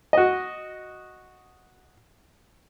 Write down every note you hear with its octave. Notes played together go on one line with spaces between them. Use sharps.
F#4 D#5